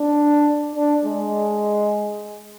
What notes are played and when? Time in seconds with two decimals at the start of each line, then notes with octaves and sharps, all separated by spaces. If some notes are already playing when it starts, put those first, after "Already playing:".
Already playing: D4
0.75 D4
1.05 G#3